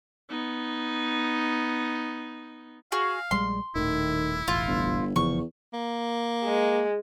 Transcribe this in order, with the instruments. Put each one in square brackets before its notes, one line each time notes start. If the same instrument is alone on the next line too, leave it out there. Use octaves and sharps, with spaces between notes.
[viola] B3 D#4
[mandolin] F#4 G#4 [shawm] F5
[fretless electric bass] A#1 G3 G#3 [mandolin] C6
[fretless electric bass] D#1 A2 [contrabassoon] D#3 [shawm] E4
[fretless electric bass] E1 A1 [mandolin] F4
[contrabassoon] G1
[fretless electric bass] F1 C#3 F3 [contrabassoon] E2 [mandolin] C#6
[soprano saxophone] A#3
[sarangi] G#3